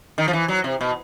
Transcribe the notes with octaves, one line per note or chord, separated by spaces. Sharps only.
D#3
F3
E3
F#3
C3
B2